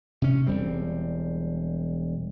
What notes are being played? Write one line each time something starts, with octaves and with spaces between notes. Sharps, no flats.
C3 C#4
E1 G3 C4